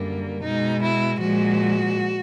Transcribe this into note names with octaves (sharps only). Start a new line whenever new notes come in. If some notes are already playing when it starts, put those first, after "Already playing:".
Already playing: F#2 D3 G3 A#3
B2 G#3 D#4
E4
A#2 F3 G#3 F#4